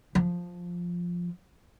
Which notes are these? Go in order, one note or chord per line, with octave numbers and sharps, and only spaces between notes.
F3